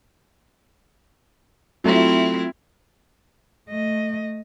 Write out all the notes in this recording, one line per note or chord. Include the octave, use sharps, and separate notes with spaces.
F#3 A3 C4 E4 F4
A3 D#5